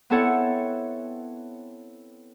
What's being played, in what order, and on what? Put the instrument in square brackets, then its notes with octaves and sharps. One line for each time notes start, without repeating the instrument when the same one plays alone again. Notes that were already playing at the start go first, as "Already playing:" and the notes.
[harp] B3 C4 E4 A4 C#5 F#5